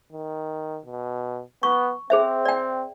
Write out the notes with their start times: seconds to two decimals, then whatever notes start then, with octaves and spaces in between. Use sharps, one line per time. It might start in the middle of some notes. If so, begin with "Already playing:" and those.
0.12 D#3
0.86 B2
1.63 B3 C#6
2.10 C4 G#4 C5 E5
2.45 D5 G5